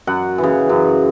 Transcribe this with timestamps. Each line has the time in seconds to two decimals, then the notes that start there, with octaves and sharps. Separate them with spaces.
0.07 F#2 F#5
0.38 E3
0.43 C#3
0.69 F#2